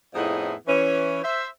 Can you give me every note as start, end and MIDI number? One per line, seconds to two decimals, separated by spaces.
0.14 0.54 41
0.14 0.54 45
0.14 0.54 59
0.14 0.54 63
0.14 0.54 64
0.14 0.54 68
0.67 1.20 52
0.67 1.20 61
1.24 1.47 72
1.24 1.47 76